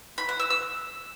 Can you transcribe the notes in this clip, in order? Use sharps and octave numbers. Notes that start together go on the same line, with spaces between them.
B5
F#5
E6
E6